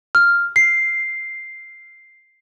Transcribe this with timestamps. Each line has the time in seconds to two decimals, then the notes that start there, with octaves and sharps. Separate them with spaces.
0.15 F6
0.56 C7